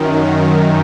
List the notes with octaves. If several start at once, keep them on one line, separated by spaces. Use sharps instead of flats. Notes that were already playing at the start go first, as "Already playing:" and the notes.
Already playing: F#2 D#3